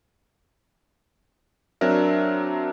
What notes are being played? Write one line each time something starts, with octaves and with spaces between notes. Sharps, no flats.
F#3 C4 D4 A#4 E5